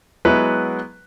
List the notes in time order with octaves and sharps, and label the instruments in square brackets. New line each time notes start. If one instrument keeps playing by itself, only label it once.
[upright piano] F#3 G#3 B3 E4 B4